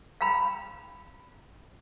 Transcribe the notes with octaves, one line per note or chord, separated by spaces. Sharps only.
F5 G5 A#5 B5